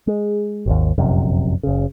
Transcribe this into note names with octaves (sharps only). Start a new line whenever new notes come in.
G#3
G#1 D#2
F1 A#1 F#2 C3
F#1 C#3